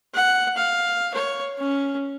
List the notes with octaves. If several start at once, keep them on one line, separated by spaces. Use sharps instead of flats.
F#5
F5
C#5
C#4